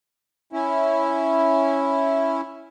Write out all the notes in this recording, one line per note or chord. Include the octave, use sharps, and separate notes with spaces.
C#4 E4